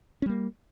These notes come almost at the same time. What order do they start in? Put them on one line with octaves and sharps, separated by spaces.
C#4 G3 A#3